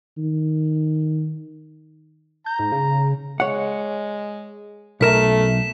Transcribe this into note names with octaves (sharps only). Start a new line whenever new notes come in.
D#3
A#5 G6
G#2
C#3
G#3 C#5 F#5
B1 A3 A#4 A#5 B6 E7